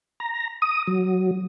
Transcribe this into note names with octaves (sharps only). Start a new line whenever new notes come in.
A#5
D#6
F#3